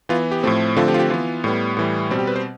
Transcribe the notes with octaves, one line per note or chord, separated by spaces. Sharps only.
E3 B3 F4
G4
A2 F3 A3 C4
D3 F3 A3 C4 F4
G4
F4
G4
E3 B3 F4
A2 G3 B3
A2 E3 G3
B2 G3 C4
G4
B4
C5